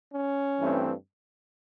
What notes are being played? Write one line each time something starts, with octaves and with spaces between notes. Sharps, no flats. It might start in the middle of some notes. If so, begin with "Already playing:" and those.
C#4
G2 E3 A3 C4